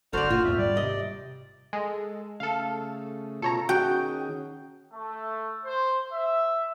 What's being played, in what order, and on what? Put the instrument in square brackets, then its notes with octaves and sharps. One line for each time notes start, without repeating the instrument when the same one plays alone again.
[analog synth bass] G1 [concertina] F#4 C5 F6 [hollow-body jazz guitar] A4 D5
[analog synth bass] A#2 [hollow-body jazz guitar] F4
[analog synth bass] G#1 [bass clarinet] E2 [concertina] E5
[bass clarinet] G3 [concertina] D5
[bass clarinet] C3 [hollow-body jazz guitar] D#5
[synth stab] G#3 [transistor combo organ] A4
[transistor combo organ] C#3 A3 [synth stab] A4 F5
[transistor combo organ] B2 F4 [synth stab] A4 C#5 A#5
[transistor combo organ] D#3 C#4 G#4 [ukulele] F#4 [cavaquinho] G5 [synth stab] G6
[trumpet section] A3
C5
E5